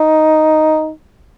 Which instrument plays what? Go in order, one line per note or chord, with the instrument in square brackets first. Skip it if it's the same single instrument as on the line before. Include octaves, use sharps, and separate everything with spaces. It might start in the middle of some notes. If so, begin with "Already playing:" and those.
Already playing: [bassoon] D#4